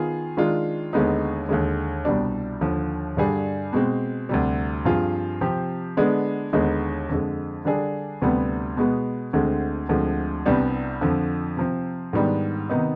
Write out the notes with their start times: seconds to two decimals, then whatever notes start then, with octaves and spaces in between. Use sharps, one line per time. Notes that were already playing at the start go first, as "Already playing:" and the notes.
Already playing: D#3 B3 F4 G#4
0.37 D#3 G#3 D4 F4
0.93 D#2 D3 G#3 B3 D#4
1.49 D#2 D3 G#3
2.05 C2 B2 G3 D4
2.61 D#2 D3 F3
3.17 G2 D3 G3 D4 G#4
3.73 B2 G#3 C4
4.29 D2 C3 G3
4.85 G2 F3 C4 F4 G#4
5.41 C3 F3 C4 G4
5.97 D3 G#3 B3 D4
6.53 D#2 D3 G#3 B3 D#4
7.09 F2 D3 G#3
7.65 D3 G3 D4 G#4
8.22 D2 C3 G3 B3
8.77 B2 G#3 B3
9.33 D2 D3 G#3 C4
9.89 D2 D3 F3 G#3 C4
10.46 C2 C3 G3 B3 D4
11.01 F2 D3 F3
11.57 C3 F3 C4
12.13 G#2 D#3 G3 B3 D4
12.69 C3 D#3 B3 D#4